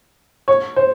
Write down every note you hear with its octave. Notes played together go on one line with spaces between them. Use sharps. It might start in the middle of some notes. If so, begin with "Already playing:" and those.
C#5
C5